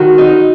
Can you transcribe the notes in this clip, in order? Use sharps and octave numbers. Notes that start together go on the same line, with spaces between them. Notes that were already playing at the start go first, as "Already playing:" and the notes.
Already playing: D#3 F#4
D#4